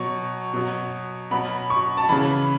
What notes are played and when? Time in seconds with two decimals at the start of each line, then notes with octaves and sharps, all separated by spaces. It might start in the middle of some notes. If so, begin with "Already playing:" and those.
Already playing: B2 F#3 C#6
0.53 B2 F#3
1.31 B2 F#3 B5
1.70 C#6
1.97 A5
2.09 C#3 E3 B5